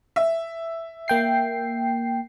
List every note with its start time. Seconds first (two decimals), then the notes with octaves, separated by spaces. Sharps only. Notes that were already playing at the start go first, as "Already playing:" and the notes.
0.16 E5
1.08 A#3 G5 C7